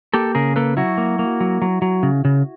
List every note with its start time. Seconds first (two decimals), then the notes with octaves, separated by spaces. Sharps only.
0.14 A#3 G4 A4
0.35 C#3 G#4 A#4
0.56 A#3 A4 B4
0.77 F#3 E4 F#4
0.98 A#3
1.19 A#3
1.40 F#3
1.62 F#3
1.82 F#3
2.03 C#3
2.25 C#3